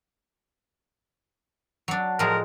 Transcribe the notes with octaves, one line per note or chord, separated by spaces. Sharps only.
F#3 D4
A2 F3 G#3 A#4